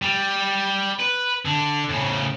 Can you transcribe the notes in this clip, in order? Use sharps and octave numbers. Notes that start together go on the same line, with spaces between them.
G3
B4
D3
A2 C#3